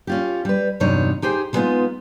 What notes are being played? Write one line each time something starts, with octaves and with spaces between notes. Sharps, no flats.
C#4 F4 G4
G3 B4
E2 G2 C3 F#3 D#4 C#5
D#4 G4 G#4 C5
D3 G3 G#3 B3 D#4 F4